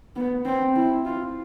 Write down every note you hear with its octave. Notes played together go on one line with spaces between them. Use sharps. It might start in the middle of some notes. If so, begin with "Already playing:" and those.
B3
C4
E4
F4